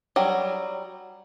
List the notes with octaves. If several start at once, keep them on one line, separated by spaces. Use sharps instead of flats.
F#3 G3